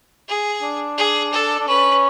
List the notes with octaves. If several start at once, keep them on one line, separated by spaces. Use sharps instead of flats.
G#4
D4
G#4
A4
D4
C#4 B4